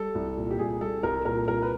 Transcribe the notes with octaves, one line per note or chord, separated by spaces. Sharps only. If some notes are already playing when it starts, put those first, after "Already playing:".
Already playing: G3 A4
C2
A#2
G4
C2 G#4
G3 A4
C2 A#4
A#2 A#4
C2 A#4
B4